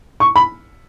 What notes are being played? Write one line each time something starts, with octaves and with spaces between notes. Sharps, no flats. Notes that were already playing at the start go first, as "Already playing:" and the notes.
C#6
B5